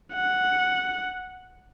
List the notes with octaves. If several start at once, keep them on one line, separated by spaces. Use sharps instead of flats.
F#5